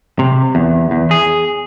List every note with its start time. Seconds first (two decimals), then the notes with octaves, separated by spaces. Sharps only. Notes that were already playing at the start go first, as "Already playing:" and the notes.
0.19 C3
0.55 E2
0.91 E2
1.11 G#4